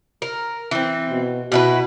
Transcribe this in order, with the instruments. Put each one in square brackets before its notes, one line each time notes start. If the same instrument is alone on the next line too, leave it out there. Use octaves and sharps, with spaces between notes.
[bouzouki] A#4
E3 C4
[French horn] B2
[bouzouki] B2 E4 B4 [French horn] F#4